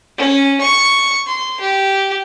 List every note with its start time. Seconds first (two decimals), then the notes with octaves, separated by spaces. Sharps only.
0.17 C#4
0.61 C#6
1.27 C6
1.60 G4